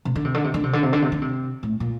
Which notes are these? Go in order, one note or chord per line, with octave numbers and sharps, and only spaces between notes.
C3
D3
C3
D3
C3
D3
C3
D3
C3
D3
C3
D3
C3
A2
A#2